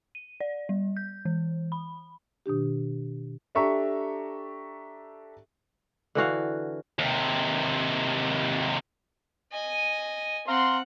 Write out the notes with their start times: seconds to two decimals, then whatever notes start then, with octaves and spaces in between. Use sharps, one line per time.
0.15 D#7
0.40 D5
0.69 G3
0.97 G6
1.25 E3
1.72 B5
2.46 B2 D#3 D4 G4
3.55 D4 G4 A4 E5 A#5 C#6
6.15 D3 E3 F#4 F5
6.99 D#2 C3
9.52 D#5 G#5
10.48 C4 F5 F#5 A#5 C6